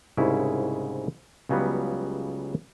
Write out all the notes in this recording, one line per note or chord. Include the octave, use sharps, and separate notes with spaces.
C2 G#2 C#3 C#4 E4
C#2 C#3 F#3 G3 B3